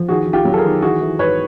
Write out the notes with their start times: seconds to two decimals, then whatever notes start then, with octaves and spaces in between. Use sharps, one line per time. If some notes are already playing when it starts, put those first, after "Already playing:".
Already playing: F3
0.08 D#3 F#4 G#4
0.27 D#3
0.33 F4 G4
0.45 F#3
0.54 A4
0.57 G#4 A#4
0.64 D#3
0.82 E3 F#4 G#4
1.01 E3
1.19 G#2 B4 C#5